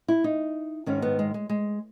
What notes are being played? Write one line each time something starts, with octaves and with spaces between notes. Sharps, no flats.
E4
D#4
G#2 D#3 C#4
B3
G#3
G#3
G#3